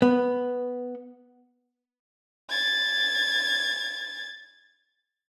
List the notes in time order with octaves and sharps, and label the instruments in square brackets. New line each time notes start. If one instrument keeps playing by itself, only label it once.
[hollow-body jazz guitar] B3
[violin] G#6 A6